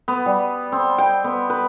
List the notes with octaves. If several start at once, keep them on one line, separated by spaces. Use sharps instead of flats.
B3
G3
C4
G5
B3
B4